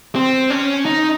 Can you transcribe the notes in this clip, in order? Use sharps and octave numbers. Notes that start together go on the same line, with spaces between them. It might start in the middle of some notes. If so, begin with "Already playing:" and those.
C4
C#4
D#4